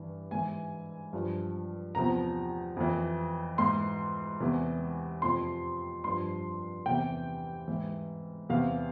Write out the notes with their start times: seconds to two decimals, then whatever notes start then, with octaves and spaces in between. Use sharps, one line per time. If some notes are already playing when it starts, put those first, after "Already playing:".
Already playing: G2 E3
0.31 G#2 E3 G#5
1.13 G2 F3
1.95 E2 C3 F3 A#5
2.77 F2 E3
3.58 G#2 E3 C6
4.40 E2 C3 E3
5.22 F2 C3 F3 C6
6.04 G2 F3 C6
6.86 E2 C3 E3 G5
7.68 G#2 E3
8.49 E2 C3 E3 F5